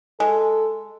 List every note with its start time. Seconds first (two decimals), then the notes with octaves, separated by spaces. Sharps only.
0.20 G#3 A4